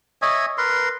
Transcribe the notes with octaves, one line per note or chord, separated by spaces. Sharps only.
C#5 D#5 E5 G#5
A#4 B4 C6